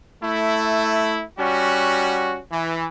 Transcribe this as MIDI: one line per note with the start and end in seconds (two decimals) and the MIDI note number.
0.23 1.23 57
0.23 1.23 64
1.39 2.40 55
1.39 2.40 61
1.39 2.40 66
2.52 2.87 52